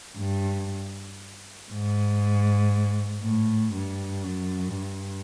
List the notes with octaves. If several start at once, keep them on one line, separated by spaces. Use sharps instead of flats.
G2
G#2
A2
G2
F#2
G2